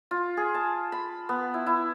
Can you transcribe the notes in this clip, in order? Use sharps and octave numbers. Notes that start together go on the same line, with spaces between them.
F4
G#4
A5
B5
B3
E4
E4